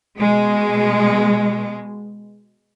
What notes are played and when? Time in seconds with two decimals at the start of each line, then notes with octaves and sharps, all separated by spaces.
0.19 B2 G#3